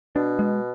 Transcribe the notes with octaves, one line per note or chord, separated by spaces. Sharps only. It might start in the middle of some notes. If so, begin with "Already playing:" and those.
B2 D4
G#3